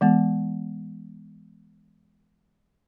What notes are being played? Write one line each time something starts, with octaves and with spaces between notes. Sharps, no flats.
E3 G#3 B3